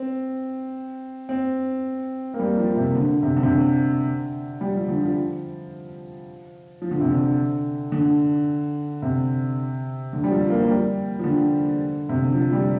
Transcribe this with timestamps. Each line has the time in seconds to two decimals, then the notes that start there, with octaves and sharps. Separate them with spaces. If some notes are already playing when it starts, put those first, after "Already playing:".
Already playing: C4
1.29 C4
2.34 A#3
2.39 G3
2.58 F3
2.76 C3
2.95 D3
3.23 C3
3.37 D3
3.43 C3
3.52 D3
4.61 G3
4.74 F3
4.89 D3
5.02 F3
6.82 F3
6.91 D3
7.01 C3
7.10 D3
7.92 D3
9.02 C3
10.13 D3
10.24 G3
10.31 F3
10.50 A#3
10.62 F3
10.68 G3
11.19 F3
11.24 D3
12.09 C3
12.22 D3
12.34 F3
12.53 G3